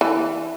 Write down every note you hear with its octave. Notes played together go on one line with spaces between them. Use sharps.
E3